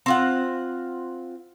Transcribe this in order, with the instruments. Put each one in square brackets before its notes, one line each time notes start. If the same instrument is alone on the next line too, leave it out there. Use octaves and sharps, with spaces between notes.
[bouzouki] C4 F4 F#5